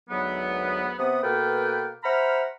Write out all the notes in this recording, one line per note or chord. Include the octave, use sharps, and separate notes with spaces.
D2 G#2 F#3 B3
C3 B3 D#6
B2 A#3 A4 B4 F5 G5
C5 E5 F#5 A#5 B5 F6